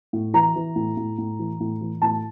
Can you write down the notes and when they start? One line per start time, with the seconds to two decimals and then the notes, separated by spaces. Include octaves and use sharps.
0.13 A2
0.34 E3 A#5
0.56 E3
0.76 A2
0.97 A2
1.18 A2
1.39 E3
1.60 A2
1.81 E3
2.02 A2 A5